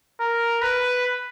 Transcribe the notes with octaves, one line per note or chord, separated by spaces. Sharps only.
A#4
B4